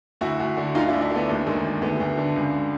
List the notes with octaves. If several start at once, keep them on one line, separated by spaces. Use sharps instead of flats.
D2 E4 F#4
D2
D3
D2 D#4 F4
D4 E4
D2
D4 E4
D3 A3 B3
D#2 A3
D#3 G#3
D#3
D2 A3 B3
D2
D3
C#2